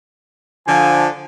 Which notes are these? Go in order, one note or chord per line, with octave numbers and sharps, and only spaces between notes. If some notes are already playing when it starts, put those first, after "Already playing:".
D3 F3 G#5